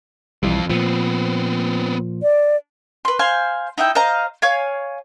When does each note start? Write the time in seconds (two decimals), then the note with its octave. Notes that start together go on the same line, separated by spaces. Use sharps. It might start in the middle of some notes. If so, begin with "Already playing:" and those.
0.43 B1 F2 E3 G3 F4
0.70 A#2 F3 B3 C4
2.23 D5
3.05 B4 C6
3.19 C5 F5 G#5 C6
3.78 D#4 E4 E5 G5
3.95 C5 D#5 F5 A#5
4.42 C#5 F5 G#5